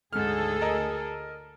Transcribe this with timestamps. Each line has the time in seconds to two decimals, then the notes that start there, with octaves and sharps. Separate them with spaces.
0.13 D2 G#2 G#4 A4 F6
0.61 A#4 D#5 F6